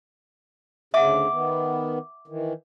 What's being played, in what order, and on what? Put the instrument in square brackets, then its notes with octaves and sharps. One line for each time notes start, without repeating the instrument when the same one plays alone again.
[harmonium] D2 C#3 [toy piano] E5 F#5 [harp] D6
[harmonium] D#3 B3
D#3 E3